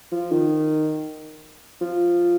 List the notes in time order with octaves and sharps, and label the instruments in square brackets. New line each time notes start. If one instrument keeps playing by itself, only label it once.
[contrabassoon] F3
D#3
F3